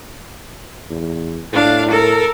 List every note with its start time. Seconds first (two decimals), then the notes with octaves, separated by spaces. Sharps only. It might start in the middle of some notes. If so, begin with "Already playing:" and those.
0.90 E2
1.53 A2 D4 F5
1.90 A4 A#4